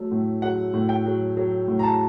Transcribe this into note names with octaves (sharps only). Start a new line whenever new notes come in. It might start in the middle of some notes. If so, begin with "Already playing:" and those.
Already playing: F#3 A3
A2
F#3 F#5
A2
G5
F#3
F#3
A2
A#5
A5